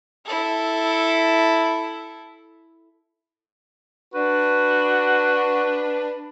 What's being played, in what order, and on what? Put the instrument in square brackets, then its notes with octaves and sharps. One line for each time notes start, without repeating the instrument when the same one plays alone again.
[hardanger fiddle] E4 A4
[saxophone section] D4 B4 [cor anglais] F#4